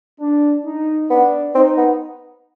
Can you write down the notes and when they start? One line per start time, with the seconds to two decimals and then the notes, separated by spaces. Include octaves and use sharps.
0.20 D4
0.65 D#4
1.10 B3 D4
1.55 C4 D#4
1.78 B3